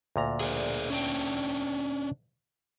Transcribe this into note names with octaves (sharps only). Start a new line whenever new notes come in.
D2 A#2 A#5
G#4 A#4 D5
C#4 D4 G5